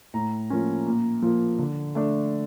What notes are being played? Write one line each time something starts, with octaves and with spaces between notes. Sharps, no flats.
A2 A#5
F3 A#3 C#4
A#2
F3 A#3
D3
A3 D4